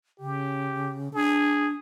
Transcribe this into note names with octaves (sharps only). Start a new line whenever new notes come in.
C#3 G4
D4 G#4